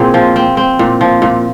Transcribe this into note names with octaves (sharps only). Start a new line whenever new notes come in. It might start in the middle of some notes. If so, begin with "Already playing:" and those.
Already playing: A#2 C4 G#4
F3
C4
C4
A#2
F3
A#2